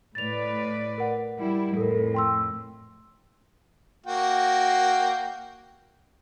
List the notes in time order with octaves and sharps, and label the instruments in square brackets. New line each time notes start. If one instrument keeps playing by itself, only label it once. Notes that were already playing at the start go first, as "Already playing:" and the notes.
[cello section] A2 B4 D5 [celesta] A6 F7
[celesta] A#4 F#5
[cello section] G3 E4
[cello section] F2 A2 [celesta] A4 A#4
[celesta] G5 C6 E6
[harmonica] A#3 F#4 G5